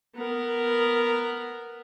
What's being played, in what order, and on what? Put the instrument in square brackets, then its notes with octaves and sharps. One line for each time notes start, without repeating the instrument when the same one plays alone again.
[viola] B3 A#4